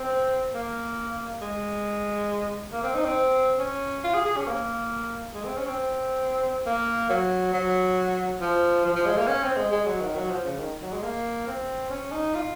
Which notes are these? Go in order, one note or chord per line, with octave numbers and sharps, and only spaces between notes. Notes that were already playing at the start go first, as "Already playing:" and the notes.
Already playing: C4
A#3
G#3
A#3
C4
D#4
C4
C#4
F4
G#4
G#4
C#4
A#3
G#3
C4
C#4
C4
A#3
F#3
F#3
F3
F3
F3
G#3
A#3
C#4
C4
G#3
G#3
F#3
D#3
F#3
F3
C#3
D#3
F#3
G#3
A#3
C4
C#4
D#4
F4